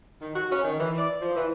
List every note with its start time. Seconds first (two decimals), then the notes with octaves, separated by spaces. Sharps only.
0.20 D#3
0.35 F#4
0.51 C#4
0.63 D#3
0.79 E3
0.97 D5
1.20 F3
1.36 E3